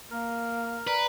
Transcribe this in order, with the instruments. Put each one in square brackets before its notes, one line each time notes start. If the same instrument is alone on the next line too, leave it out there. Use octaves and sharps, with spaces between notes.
[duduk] A#3 [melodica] A#4
[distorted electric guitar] B4 [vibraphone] D5 A#5